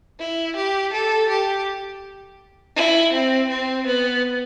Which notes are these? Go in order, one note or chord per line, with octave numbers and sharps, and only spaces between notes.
E4
G4
A4
G4
E4
C4
C4
B3